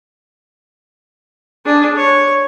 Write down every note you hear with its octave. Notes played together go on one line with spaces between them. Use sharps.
D4 G#4
C#5